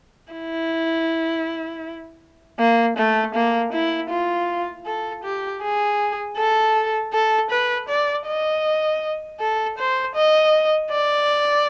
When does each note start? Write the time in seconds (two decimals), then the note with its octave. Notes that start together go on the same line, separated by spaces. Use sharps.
0.32 E4
2.59 A#3
2.97 A3
3.35 A#3
3.73 E4
4.10 F4
4.85 A4
5.24 G4
5.62 G#4
6.37 A4
7.12 A4
7.50 B4
7.89 D5
8.27 D#5
9.40 A4
9.78 C5
10.15 D#5
10.91 D5